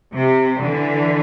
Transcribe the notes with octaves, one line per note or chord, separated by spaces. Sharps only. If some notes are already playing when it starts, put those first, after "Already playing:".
C3
D3 E3